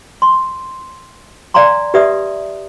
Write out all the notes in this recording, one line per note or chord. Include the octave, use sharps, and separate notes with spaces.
C6
D5 F5 G#5 A#5 C6
G4 B4 D5 E5 D#6